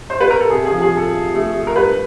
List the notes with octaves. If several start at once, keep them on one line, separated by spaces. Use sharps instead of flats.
C5
B4
A#4
A4
C3 G#4
G#4
F3
G#4
F3
A4
C3
A3
A3
A#4
G2 B4